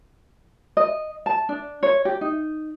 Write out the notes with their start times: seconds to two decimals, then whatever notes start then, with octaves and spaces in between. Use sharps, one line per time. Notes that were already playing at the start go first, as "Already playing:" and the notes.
0.77 D#5
1.26 A5
1.49 D4
1.83 C#5
2.05 G4
2.21 D#4